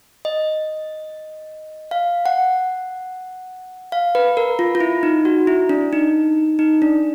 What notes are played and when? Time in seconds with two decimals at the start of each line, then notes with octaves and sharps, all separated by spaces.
0.25 D#5
1.91 F5
2.26 F#5
3.92 F5
4.15 B4
4.37 A#4
4.59 F4
4.75 F4
4.80 E4
5.03 D#4
5.25 F#4
5.47 E4
5.69 D4
5.93 D#4
6.59 D#4
6.82 D4